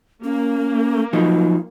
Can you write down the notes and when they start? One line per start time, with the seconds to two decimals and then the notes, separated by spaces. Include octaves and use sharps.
0.24 A#3 C#4
1.13 F3 F#3 D#4 F4